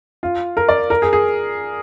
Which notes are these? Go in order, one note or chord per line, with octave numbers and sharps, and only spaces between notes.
F4
A#4
D5
A#4
G#4
G#4